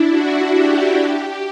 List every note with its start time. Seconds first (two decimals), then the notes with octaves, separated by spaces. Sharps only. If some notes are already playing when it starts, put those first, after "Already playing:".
Already playing: D4 E4
0.09 F#4
0.54 G4
0.98 G4